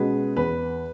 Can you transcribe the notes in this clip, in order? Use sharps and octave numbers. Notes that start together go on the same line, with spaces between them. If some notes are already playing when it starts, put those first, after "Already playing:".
Already playing: B2 G#3 C#4 G#4 B4
E2 B4